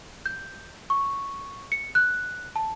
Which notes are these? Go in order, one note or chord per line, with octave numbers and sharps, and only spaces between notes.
G6
C#6
C#7
F#6
A5